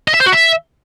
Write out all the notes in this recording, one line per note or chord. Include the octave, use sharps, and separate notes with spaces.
D#5
E5
C5
F#4
E5